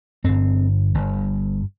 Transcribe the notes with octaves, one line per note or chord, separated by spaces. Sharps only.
G1 G2 C4
G1 G2